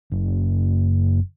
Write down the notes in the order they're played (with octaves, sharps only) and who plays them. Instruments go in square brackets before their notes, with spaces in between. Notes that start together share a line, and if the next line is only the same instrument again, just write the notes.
[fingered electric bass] F#1